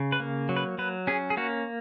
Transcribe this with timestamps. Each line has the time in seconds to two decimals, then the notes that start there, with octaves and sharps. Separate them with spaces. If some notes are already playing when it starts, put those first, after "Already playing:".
Already playing: C#3
0.12 B4
0.20 A#3
0.49 F#3
0.56 B4
0.78 F#3 B4
1.07 C#4 G#4
1.30 G#4
1.37 A#3 F#4